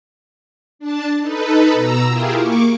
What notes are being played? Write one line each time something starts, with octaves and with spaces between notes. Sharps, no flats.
D4 A5
D#4 A4 B4
B2 A#5 E6
E4 F4 G4 G#4 A#4
A#3 C#6 D6